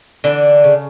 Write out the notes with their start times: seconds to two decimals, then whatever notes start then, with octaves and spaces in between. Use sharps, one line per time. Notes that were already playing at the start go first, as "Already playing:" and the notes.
0.24 D3 E3 D4
0.64 C#3